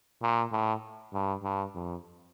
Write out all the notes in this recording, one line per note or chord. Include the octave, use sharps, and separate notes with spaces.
A#2
A2
G2
G2
F2